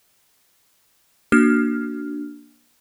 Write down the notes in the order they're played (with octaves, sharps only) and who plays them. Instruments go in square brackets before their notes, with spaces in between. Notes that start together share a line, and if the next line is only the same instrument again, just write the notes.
[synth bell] A#3 D4 F#4 F6